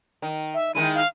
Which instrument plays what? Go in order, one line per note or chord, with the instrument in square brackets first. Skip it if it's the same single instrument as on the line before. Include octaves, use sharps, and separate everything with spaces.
[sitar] D#3
[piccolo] E5
[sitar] D#3 G#3 E4 [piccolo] D#7
[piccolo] F5